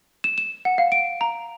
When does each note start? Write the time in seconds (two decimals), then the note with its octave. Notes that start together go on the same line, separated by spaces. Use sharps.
0.24 E7
0.38 E7
0.65 F#5
0.78 F5
0.92 D7
1.21 A#5